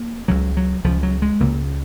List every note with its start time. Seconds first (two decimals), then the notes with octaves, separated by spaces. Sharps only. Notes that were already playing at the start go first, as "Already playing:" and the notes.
Already playing: A#3
0.28 C#2 C#3 F#3
0.57 F#3
0.84 C#2 C#3 F3
1.03 F#3
1.22 G#3
1.40 C#2 C#3 A#3